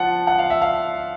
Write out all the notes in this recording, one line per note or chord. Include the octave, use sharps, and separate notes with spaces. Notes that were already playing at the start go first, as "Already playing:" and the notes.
Already playing: F3 F#5 A5
F#5
F5
E5
F5